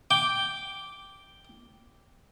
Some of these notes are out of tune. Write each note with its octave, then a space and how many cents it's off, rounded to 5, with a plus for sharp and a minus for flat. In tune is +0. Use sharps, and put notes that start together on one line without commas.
G5 +0 D6 -10